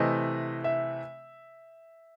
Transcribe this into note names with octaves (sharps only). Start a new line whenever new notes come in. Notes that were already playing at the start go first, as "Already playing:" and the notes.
Already playing: C3 E3 A3 C4 D#5
E5